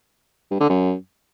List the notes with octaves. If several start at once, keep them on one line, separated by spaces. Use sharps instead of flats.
G2
D3
F#2